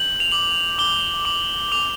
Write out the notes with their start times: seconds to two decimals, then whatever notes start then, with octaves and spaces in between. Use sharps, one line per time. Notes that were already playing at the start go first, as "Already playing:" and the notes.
Already playing: G6 F#7
0.20 F7
0.31 D6 F#7
0.78 D6 G7
1.25 D6 F#7
1.72 D6 F7